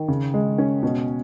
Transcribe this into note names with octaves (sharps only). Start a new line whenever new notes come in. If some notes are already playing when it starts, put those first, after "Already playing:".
Already playing: D#3
C#3
G#3
C#4
B2